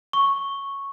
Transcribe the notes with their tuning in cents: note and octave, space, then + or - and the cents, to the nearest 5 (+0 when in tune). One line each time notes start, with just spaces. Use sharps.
C#6 -5